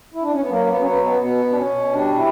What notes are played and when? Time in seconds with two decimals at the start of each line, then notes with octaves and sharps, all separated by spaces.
0.14 E4
0.23 D4
0.32 C#4
0.41 B3
0.50 F#3 A#3
0.68 B3
0.74 F#3
0.80 C#4
0.86 B3
0.98 B2
1.04 B3
1.21 B2 B3
1.45 B2
1.50 D4
1.57 C#4
1.69 B2
1.92 G3 D4
2.16 E3 E4